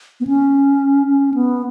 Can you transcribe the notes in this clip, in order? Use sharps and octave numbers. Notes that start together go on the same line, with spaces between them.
B3
C#4
C#4
B3